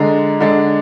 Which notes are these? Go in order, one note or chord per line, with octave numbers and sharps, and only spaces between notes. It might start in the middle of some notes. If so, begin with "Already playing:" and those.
Already playing: D3 G#3 D4 A#5
D3 G#3 D4